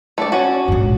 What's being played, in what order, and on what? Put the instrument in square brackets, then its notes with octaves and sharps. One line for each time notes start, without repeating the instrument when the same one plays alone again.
[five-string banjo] A3 D4 D5
C#4 F#4
[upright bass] A#1 G#2